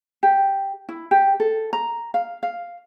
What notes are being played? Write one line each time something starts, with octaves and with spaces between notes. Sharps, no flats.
G4
E4
G4
A4
A#5
F5
F5